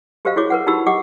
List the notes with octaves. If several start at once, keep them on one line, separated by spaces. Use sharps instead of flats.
F#4 G4 A#4 C5 D#5 F5
E4 F#4 G#4 C#5 D6
A#4 B4 F#5
D#4 E4 F#4 G4 B5 E6
G4 D#5 F#5 D6